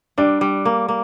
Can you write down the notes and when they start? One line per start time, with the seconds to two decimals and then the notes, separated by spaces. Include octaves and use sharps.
0.18 G3 D4
0.41 G3
0.65 A#3
0.89 A#3